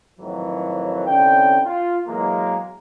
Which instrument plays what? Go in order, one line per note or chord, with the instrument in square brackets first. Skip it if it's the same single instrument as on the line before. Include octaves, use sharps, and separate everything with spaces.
[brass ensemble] F2 A2 D#3 E3 F#3
C2 D3 C#4 G5
F4
B2 E3 F#3 G#3 A#3